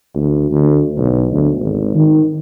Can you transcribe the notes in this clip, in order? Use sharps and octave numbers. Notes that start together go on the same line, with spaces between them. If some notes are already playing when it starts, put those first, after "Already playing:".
D2
D2
B1
D2
G#1
D#3